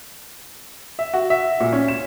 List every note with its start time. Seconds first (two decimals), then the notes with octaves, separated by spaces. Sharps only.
0.99 E5
1.14 F#4
1.30 E5
1.60 A#2
1.73 C#4
1.88 E7